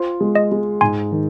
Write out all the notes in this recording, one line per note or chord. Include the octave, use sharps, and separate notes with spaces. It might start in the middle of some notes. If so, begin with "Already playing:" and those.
Already playing: F4 C5
G#3
D#5
G#3
G#2 G#5 C6
D#3